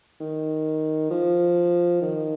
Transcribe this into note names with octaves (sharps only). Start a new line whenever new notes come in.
D#3
F3
D#3